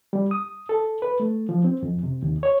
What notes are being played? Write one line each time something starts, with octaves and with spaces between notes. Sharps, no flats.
G3
D#6
A4
B4
A3
F3
C4
F2
C3
D#2
C#5